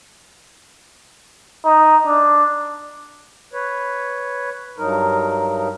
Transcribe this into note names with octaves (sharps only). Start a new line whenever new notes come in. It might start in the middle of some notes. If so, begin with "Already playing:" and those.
D#4
D4
B4 C#5
G2 F#3 D#4 A#4